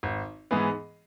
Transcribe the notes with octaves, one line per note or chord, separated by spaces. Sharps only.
G#1
G#2 E3 B3 G#4